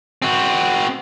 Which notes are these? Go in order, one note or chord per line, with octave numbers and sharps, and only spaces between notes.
C4 F#4